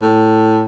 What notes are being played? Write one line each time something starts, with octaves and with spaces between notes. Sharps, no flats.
A2